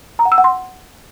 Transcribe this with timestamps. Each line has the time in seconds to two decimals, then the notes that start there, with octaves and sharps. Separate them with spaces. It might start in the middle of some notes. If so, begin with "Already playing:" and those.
0.19 A#5
0.25 F#5
0.32 E6
0.38 F#5
0.44 C6